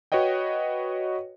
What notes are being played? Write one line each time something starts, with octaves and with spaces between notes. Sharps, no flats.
F#4 B4 C#5 D#5 G5